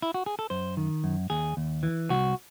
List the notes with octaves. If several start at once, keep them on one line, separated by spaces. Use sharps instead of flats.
E4
F#4
G#4
A4
F#2 C5
D#3
F#2
D#2 G#4
D#2
E3
C2 F#4